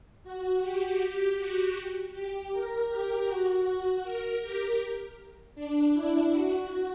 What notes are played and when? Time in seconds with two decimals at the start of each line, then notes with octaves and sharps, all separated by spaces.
0.24 F#4
0.62 G4
1.00 G4
1.38 F#4
2.14 G4
2.52 A#4
2.89 G4
3.27 F#4
4.03 A#4
4.42 G4
5.55 D4
5.94 E4
6.32 F#4